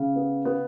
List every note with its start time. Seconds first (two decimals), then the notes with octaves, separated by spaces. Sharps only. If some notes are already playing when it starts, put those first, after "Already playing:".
Already playing: C#3
0.16 B3
0.45 B3